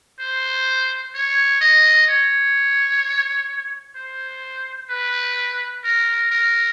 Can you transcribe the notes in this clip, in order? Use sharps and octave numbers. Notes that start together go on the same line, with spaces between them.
C5
C#5
D#5
C#5
C5
B4
A#4
A#4